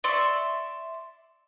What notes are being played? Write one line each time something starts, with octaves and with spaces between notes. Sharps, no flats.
D5 E5 C6 C#6